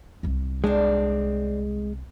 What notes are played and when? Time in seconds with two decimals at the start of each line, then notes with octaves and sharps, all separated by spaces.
0.23 C2 C3
0.64 G#3 C4 D4